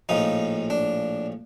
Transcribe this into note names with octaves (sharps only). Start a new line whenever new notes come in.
A#1 A2 F3 D#4
D4